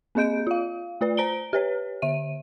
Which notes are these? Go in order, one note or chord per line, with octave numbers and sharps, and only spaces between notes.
A#3 C4 G#4 D#5 G6 D7
F4 F5
A3 F4 B4 D5
C5 A#5 D7 G7
G4 B4 C#5
D3 E5 D#7